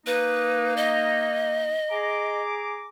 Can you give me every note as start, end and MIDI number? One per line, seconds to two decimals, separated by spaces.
0.07 1.75 58
0.07 1.75 63
0.07 0.74 71
0.77 2.41 75
1.90 2.87 68
1.90 2.87 82
1.90 2.87 86